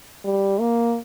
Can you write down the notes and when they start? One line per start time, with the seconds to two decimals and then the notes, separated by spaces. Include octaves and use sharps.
0.25 G3
0.60 A#3